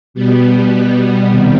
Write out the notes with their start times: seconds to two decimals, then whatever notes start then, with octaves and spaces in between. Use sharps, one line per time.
0.14 B2 G3 B3
1.29 C3 D#3 G3